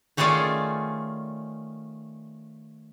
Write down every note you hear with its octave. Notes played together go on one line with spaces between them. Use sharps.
D#3 A3 C#4 F4 G#4 D5